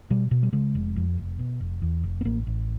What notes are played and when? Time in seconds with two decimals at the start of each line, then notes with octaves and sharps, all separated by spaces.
0.10 B2 G3
0.31 B2
0.43 G3
0.53 C#3 G#3
0.75 F1
0.96 F2
1.17 F1
1.39 B2
1.60 F1
1.82 E2
2.04 F1
2.21 B3
2.25 A1 A#3
2.47 A1